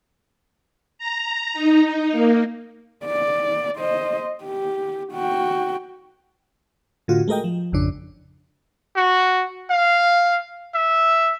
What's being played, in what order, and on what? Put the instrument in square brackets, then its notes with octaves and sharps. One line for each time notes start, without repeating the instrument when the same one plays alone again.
[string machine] A#5
D#4
A#3
[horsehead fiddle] D5
C5 D#5
G4
F#4 G5
[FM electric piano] A2 D3 F4 F#4
G#3 A3 A#4 D#5 G5
F3
G#1 F2 C#3 D4
[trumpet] F#4
F5
E5